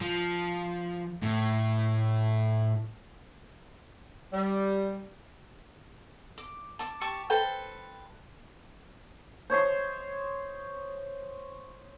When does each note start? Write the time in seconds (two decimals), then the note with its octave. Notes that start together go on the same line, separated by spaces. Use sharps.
0.01 F3
1.22 A2
4.32 G3
6.38 D6
6.79 A5 D6
7.01 G4 A5 C#6 D6
7.30 A4 B4 C5 G5
9.50 C5 C#5 D#5 C6